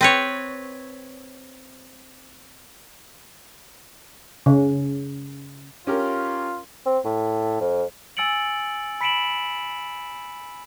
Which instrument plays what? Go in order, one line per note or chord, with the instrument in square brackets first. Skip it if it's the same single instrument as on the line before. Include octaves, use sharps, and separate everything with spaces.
[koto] C4 B4 C#5
[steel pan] C#3
[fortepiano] C#4 G4 A#4 [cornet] F4
[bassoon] C4
A2
F2
[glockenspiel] G#5 E6 A6 C#7 D7 F#7
B5 B6 C#7 D7 E7 F#7